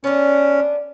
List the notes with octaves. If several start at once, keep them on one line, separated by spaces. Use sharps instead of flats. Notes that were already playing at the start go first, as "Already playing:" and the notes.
B3 C#4 D4